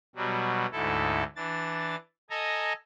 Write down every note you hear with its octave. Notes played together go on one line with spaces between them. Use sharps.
B2 F#3 G3
D2 G#2 E4 A4
E3 D4 A6
A4 D#5 G#5 A#5